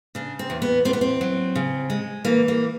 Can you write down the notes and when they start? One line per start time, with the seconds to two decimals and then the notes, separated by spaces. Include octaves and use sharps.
0.15 C#3 D4
0.39 C4
0.50 E2
0.62 B3
0.85 E2 C4
0.93 B3
1.01 C4
1.21 F#3
1.55 C#3
1.90 G#3
2.25 E3 A#3
2.48 A#3